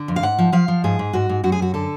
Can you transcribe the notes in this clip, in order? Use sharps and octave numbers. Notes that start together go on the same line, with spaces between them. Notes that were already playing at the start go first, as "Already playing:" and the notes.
Already playing: D3
F2
F5
G#2 F#5
F3
F3 F5
F3
G#2 G#4
G#2
G#2 F#4
G#2
F#2 F#4
G#4
F#2 F#4
D3 A4